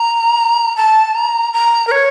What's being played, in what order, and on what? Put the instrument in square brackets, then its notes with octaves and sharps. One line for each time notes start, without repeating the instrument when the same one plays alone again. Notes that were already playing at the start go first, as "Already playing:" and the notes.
Already playing: [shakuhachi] A#5
A5
A#5
A#5
A#4
C#5